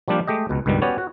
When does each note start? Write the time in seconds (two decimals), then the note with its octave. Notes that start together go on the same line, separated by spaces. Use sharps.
0.08 F3 G3 A#3 D4 F4 G4
0.27 G#3 A3 G4 D#5
0.49 C#2 B2
0.66 C#2 G2 B2 D#3 G3
0.82 B3 C#4 F#4 G4 C#5 D5
0.98 F#4